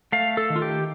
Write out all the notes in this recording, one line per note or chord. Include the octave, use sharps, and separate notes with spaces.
A3 F5
A4
D#3
F4
G4